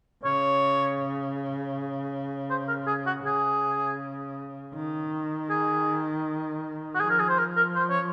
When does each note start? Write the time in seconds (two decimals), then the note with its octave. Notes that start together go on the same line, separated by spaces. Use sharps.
0.24 C#3 C#5
2.50 C5
2.68 A#4
2.87 G#4
3.07 F#4
3.25 C#3 G#4
4.75 D#3
5.50 G#4
6.95 F#4
7.00 F3 G#4
7.10 A#4
7.19 G#4
7.29 C5
7.38 A#4
7.57 A#4
7.76 C5
7.90 C#5